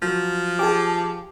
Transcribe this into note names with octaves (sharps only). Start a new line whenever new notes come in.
F3 F#3
G4 G#4 A5 D6